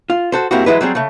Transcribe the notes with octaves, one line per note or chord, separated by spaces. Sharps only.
F4
F#4 A4 C5
G2 A#3 C4 E4 F#4
E3 F#3 G#3 E4 B4
F#3 G3 C4 G#4
C#3 A3